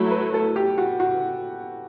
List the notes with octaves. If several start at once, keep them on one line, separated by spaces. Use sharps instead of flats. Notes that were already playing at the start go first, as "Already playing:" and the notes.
Already playing: F#3 A3 E4
B4
A4
G4
F#4
F#4